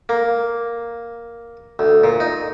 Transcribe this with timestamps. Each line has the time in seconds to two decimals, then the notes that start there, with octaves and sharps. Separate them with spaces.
0.09 A#3
1.79 D2
2.04 A#2
2.20 D#4